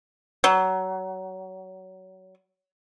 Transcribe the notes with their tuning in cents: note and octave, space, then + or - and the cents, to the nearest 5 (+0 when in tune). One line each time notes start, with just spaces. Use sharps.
F#3 +20